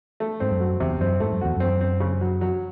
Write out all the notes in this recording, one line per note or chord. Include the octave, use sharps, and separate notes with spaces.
A3
G#2 C4
F#2
F#3
E2 C3
F#2 C4
G#2 A3
F#2
E2 F#4
F#2 C4
C4
C#3
F#3
F#3